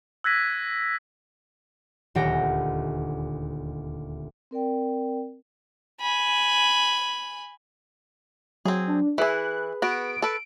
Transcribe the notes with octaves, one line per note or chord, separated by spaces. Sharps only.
E6 F#6 G#6 A#6 B6 D#7
D#1 D2 G4 F#5 G5 A#6
C4 A#4 D5 G5
G#5 B5
F#3 C4 G#4
D4
E3 E4 G#4 B4 B5 F#6
B3 F#4 D7
A4 B4